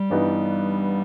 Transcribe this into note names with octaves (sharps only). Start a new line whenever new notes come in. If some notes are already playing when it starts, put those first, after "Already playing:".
Already playing: G3
G2 E3 B3 D#4